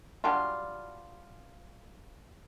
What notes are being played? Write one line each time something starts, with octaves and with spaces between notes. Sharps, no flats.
F#3 G3 D4 F4